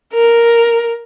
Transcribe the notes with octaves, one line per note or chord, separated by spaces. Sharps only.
A#4